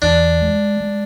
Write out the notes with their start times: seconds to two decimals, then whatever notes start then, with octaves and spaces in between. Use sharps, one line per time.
0.02 E2 D4
0.42 G#3
0.80 G#3